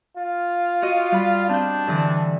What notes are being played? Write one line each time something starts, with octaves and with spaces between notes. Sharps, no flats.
F4
F#4 D#5
G3 F5 B5
C4 D4 G6
G2 D3 E3